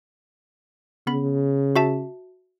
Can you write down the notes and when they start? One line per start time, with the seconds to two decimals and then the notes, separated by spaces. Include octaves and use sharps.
1.07 C#3 B3 B5
1.76 F#4 E5 A5